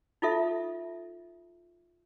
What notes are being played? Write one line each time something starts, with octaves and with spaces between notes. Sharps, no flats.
D#4 F4 A4 E5